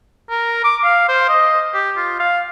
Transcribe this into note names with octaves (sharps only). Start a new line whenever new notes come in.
A#4
D6
F5
C5
D#5
G4
F4
F5